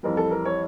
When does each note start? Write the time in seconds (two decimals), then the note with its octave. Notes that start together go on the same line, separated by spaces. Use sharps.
0.03 F2 E3 G3 A#4
0.17 A4
0.31 A#4
0.45 C#5